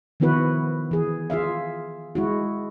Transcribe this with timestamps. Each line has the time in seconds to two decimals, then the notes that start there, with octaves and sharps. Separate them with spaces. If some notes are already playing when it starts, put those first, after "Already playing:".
0.20 D#3 F3 B3 E4 F#4 B4
0.91 E3 G#4
1.30 F4 G#4 E5 F5
2.15 G#3 E4 F#4